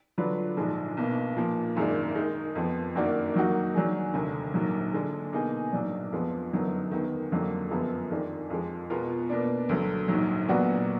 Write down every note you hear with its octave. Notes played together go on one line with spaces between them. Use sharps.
D3 F#3 D4 F4 B4
A#1 G#2 F3 G#3 D4
B1 B2 A#3
A#2 F3 A#3
G#1 F#2 D#3 G#3 D4
D#3 G#3 D#4
F2 F3 B3
F#2 D#3 A#3 D4 F#4
D#3 F#3 A#3 D#4 F#4
D#3 F#3 D4 G#4
F1 D#2 D3
A#1 G#2 F#3 A#3
D3 G#3 D4
B2 A#3 D#4 G#4 D#5
A#1 G#2 F#3 D4
F2 F3 G#3 B3
F#2 D3 F#3 B3 D#4
D#2 D#3 G#3 B3
F2 D3 F#3 A#3
F#2 F3 G#3 B3
F2 D#3 G#3 D4
F2 F3 G#3
B2 G#3 B3 F4 A#4
B2 A#3 D4
D2 D3 F#3
A#1 G#2 F#3
A#2 F#3 B3 D4 F#4